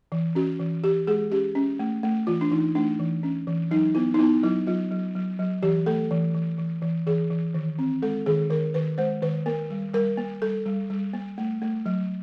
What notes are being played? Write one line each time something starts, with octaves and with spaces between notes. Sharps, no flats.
E3
C#4 F#4
E3
E3 G4
G#3 G#4
C#4 G4
C#4
A3
A3
E3 F4
D4
E3 D#4
A3 D4
E3
C#4
E3
F#3 D#4
B3 E4
D#4
B3 E4
F#3 E4
F#3 F4
F#3
F#3
F#3
E3 G4
A3 A4
E3
E3
E3
E3
E3 G#4
E3
D#3
C4
G#3 A4
D#3 G#4
D#3 A#4
D#3 B4
G#3 C5
D#3 B4
A#3 A#4
G3
G3 A#4
A#3
G3 A4
G3
G3
A#3
A3
A3
F#3